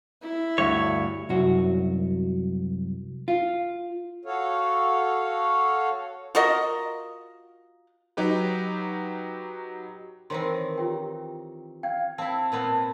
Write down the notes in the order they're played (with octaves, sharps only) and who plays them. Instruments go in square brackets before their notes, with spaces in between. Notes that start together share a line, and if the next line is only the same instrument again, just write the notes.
[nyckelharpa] E4
[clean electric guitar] D2 G2 C#5
[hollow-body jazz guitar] C2 F#2 F#4
F4
[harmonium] F#4 A4 C#5 F5
[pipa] F4 F#4 A#4 D#5
[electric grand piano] F#3 D#4 G4 B4
[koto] D#3 E3 C4 [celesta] C5 C#5 C6
[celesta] F4 G4 G5
[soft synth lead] F5 [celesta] G5 G#6
[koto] C4 E4 [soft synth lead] A5
[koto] A#2 B3 C4